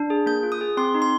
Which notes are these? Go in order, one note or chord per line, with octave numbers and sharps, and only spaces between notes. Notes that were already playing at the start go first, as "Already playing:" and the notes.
Already playing: D4
G#4
A#3 G6
F4
D#6
G#4
C4 C6
D#4
C6